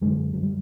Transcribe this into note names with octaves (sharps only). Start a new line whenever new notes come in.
F#2 D3 G#3
F#3
G3